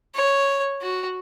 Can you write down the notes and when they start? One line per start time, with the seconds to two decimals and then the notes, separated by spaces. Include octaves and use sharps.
0.15 C#5
0.81 F#4